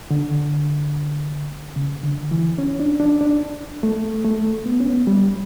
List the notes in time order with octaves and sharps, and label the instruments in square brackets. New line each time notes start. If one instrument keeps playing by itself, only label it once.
[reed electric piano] D3
C#3
D3
E3
C#4
D4
D4
D4
A3
A3
B3
C#4
B3
G3